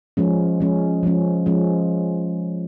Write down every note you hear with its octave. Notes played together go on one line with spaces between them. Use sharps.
F3 G#3 C#4
F3 G#3 C#4
F3 G#3 C#4
F3 G#3 C#4